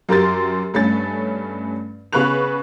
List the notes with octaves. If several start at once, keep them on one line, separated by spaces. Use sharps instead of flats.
F#2 G4 A#4 C6 A6
G2 A3 C#4 A6
C#3 B3 B4 C#6 F#6 F7